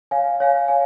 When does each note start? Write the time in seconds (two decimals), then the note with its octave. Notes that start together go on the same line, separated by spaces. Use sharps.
0.11 C#5 F5 G#5
0.40 C#5 F5 G#5
0.68 C#5 F5 G#5